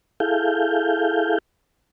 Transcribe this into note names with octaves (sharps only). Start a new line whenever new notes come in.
E4 G#4 A4 F5 G6